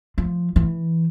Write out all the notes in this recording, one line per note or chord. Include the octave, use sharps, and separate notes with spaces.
F3
E3